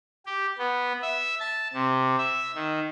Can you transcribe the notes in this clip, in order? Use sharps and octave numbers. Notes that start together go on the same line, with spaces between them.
G4
B3
E5
A5
C3
E5
D#3